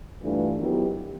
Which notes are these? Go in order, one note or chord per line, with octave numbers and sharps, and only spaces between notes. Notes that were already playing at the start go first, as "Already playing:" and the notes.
G2 E3 A3 D4 F4
D#3 F#3 B3 E4 G4